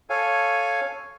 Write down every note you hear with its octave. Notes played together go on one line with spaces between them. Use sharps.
A4 C#5 F5 G#5